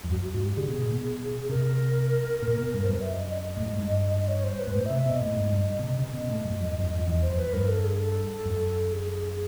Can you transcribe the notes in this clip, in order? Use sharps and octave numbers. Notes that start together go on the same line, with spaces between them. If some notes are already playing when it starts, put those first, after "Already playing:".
F2
F#2 F#4
F#4
G#2 F#4
G4
D3 G#4
B2
A#2
B2
C3 A#4
A#2
B2
G2
C5
F#2 B4
E5
D#5
D#5
D5
D#5
A2
G#2
G2
C#5
C5
B4
G#2
A2 C5
E5
C3
E5
B2 D#5
A2
G#2
G2
B2
C3
C#3
B2 D#5
A2
F#2
F2
F#2
F2
F2
E2
C5
F2
B4
G2 A#4
A4
G#4
A4
F#2
G#4